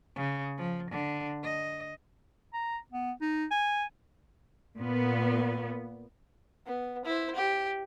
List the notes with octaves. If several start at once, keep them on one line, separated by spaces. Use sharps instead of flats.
C#3
F3
D3
D#5
A#5
B3
D#4
G#5
A#2 B3
B3
E4 C5
G4